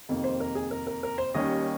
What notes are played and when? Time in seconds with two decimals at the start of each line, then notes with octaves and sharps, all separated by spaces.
0.09 F2 C3 D#3 A#3
0.24 C5
0.40 A#4
0.55 G#4
0.71 A#4
0.87 A#4
1.03 A#4
1.18 C5
1.34 D#2 D#3 G3 C#4 D#5